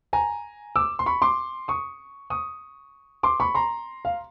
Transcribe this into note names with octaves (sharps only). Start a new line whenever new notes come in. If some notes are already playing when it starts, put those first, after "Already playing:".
G#5 A#5
D6 E6
C6
B5 C#6
C6 D6
C#6 D#6
C#6 D#6
C6 D6
B5 C#6
A#5 C6
F5